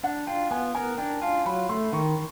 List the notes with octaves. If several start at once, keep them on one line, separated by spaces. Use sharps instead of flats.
D4 F#5
F4 G5
B3 G#5
A#4 G#5
D4 G5
F4 A5
F#3 B5
A3 C6
D#3 C#6